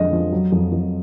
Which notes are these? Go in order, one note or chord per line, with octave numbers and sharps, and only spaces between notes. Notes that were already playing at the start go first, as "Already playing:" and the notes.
Already playing: F2 D3 F#3 G#3 D#5
F3
F#3
F2
F2